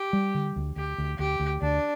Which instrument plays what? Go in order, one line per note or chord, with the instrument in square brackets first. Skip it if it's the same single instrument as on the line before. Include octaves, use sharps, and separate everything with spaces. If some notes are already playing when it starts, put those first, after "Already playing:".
Already playing: [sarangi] G4
[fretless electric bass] G3
D3
D2
[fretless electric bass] D2 [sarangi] G4
[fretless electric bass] D2
[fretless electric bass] D2 [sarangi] G4
[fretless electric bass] D2
[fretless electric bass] D2 [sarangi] D4